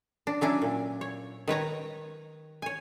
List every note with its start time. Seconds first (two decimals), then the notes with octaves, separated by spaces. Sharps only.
0.27 D4
0.41 F#3 C#4 D4 E4
0.62 A#2
1.01 C#5
1.48 D#3 B4 C#5 A#5
2.62 C#5 G#5